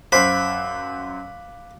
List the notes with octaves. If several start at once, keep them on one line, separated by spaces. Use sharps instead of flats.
F#2 C5 F5 B5 D6 F#6